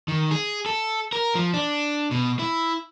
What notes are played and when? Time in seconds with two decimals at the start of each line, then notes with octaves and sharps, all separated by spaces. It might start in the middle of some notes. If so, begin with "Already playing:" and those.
0.08 D#3
0.31 G#4
0.66 A4
1.13 A#4
1.35 F3
1.54 D4
2.11 B2
2.39 E4